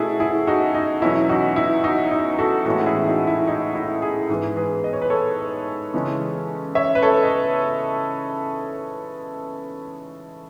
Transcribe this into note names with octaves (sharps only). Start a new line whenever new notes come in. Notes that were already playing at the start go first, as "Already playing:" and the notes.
Already playing: B2 A3 C#4 E4 F#4 G#4 A4
E4 G#4
D#4 F#4
D#4
E2 B2 F#3 C#4 E4
D#4 F#4
E4
D#4 F#4
D#4
F#4 A4
A2 E3 G#3 C#4 F#4 A4
E4 G#4
D#4 F#4
E4
D#4
E4
E4 G#4
G#2 E3 B3
G#4 B4
D#5
C#5
B4
A4 C#5
C#3 E3 G#3 C#4
C#5 E5
B4
A4 C#5
D#5